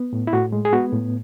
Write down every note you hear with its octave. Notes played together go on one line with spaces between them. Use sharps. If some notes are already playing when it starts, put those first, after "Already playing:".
Already playing: B3
A2
E4
A2 F#4
G#3
G#4
B3 F#4
A2